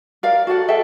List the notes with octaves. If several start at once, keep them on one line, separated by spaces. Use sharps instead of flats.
A#4 D5 F5
F#4 A4 D5 F#5
G#4 A4 E5 G5